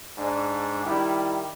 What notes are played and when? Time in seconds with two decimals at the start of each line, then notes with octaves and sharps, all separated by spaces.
0.18 G#2 D4
0.86 D#3 G3 E4